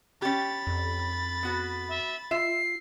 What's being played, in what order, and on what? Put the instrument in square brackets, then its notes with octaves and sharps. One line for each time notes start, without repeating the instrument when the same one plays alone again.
[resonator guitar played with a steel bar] C#4 G4 [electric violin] B5 A6
[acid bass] F2
[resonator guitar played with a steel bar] B3 F#4 B4
[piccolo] E5
[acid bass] F4 [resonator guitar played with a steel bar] E5 [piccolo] C7